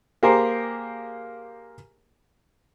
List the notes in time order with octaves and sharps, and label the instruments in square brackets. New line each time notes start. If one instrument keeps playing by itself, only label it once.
[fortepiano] A#3 G4 G#4 A#4 C5